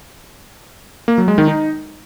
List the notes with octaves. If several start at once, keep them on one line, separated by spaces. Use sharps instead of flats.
A#3
F#3
G#3
D#3
D#4